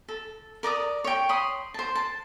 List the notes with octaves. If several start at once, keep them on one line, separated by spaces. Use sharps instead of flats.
A4
A#4 D5 A#5 D#6
C#5 G5
C#5 B5 C6 D#6
C5 A5
A5